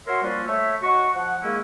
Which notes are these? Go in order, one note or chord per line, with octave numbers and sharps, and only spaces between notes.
F#4 A#4 C#5 E5 C6
F3 G3 A#3 C#4 D4 F4
A3 C#5 E5
D#4 F#4 F#5 C#6
F3 F#5
D#3 G#3 A#3 C#4 E4 G#4